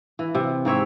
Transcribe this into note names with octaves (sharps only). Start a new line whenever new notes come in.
E3
C3
G#2 C4 C#5 E5